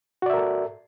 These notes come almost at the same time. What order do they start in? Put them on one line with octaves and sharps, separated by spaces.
F#4 D5 E5 A#4 A4